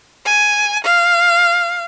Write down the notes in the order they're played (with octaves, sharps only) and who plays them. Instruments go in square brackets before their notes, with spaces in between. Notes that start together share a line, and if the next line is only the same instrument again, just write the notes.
[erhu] G#5
F5